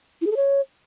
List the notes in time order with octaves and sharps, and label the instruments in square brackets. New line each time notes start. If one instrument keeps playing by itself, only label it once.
[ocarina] E4
G#4
A4
C#5